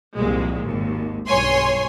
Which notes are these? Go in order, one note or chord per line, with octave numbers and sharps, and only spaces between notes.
C2 F2 A#2 G#3
G#1 D#2
B1 G2 C#5 G#5 C6